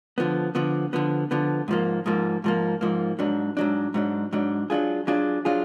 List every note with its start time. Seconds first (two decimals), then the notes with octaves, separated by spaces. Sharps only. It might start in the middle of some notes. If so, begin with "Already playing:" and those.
0.18 D3 F3 B3
0.55 D3 F3 B3
0.93 D3 F3 B3
1.31 D3 F3 B3
1.68 G#2 F3 A#3
2.06 G#2 F3 A#3
2.44 G#2 F3 A#3
2.81 G#2 F3 A#3
3.19 G#2 F#3 D4
3.57 G#2 F#3 D4
3.94 G#2 F#3 D4
4.33 G#2 F#3 D4
4.70 F#3 D4 F4 G#4
5.07 F#3 D4 F4 G#4
5.45 F#3 D4 F4 G#4